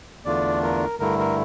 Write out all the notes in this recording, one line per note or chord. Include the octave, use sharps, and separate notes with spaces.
E2 D3 A3 D4 F4 D5
A#4
G2 D3 A3 E4 A#4
A#4